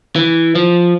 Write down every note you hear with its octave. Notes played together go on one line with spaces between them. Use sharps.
E3
F3